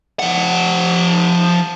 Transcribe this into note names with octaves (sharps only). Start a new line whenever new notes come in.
F3 F#5